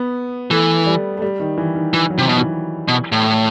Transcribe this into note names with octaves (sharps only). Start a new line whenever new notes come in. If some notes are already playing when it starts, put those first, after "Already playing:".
Already playing: B3
E3 A3
G3
A3
G3
D#3
E3
D#3
E3
F#3
C3 E3
B2 D#3
E3
B2
A2